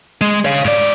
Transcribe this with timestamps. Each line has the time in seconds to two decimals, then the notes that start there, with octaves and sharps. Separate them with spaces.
0.21 G#3
0.45 C#5 F5
0.65 G#2 D5